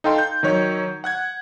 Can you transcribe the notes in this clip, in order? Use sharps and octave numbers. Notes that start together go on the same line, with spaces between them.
D#4 A4 F5 G5 C6
G6
D#3 F#3 C#5
F#5 F#6 G#6